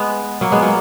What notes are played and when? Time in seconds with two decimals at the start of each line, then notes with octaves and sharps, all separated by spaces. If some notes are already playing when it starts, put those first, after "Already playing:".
Already playing: G#3 B3
0.41 F#3 A#3
0.52 G#3 B3
0.62 F#3 A#3